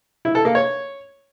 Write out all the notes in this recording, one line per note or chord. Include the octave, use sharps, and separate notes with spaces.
E4
A4
A#3
C#5